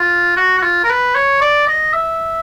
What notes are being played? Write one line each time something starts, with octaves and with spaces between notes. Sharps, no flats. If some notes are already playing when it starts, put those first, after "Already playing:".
Already playing: F4
F#4
F#4
F4
A#4
B4
C#5
D5
D#5
E5